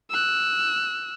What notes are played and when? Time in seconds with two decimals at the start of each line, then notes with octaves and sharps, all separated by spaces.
0.10 E6 F#6